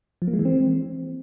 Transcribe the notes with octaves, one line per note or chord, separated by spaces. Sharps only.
F3
A#3
G#3
E3
C4